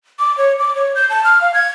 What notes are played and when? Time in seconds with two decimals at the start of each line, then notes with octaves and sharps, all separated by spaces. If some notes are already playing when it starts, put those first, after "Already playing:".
0.19 D6
0.38 C#5
0.59 D6
0.75 C#5
0.95 G6
1.10 A5
1.24 F6
1.41 F5
1.54 G#6